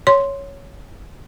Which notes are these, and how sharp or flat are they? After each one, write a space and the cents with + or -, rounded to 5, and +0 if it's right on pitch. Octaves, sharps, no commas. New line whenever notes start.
C#5 +0 C6 +0